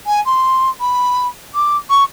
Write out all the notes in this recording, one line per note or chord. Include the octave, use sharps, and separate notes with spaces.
G#5
C6
B5
D6
C#6